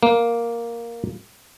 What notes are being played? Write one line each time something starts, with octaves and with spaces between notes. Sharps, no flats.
A#3